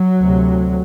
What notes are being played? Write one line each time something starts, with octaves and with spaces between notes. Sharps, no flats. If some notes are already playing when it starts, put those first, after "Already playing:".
Already playing: F#3
D2 C3